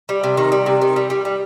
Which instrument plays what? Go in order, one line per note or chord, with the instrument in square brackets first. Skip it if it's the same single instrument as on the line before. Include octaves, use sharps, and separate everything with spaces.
[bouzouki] G3
C3
D#3
G3
C3
D#3
G3
G3
G3